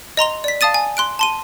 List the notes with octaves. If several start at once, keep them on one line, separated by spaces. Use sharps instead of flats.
D#5 A#5 C6 F7
D5 B6
F5 A5 D#6 A6 D#7
G#5
C6 F#6 D7
A5 C6 D#7